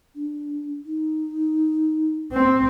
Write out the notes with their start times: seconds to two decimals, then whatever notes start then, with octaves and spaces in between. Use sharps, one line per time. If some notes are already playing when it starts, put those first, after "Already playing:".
0.16 D4
0.85 D#4
2.33 C4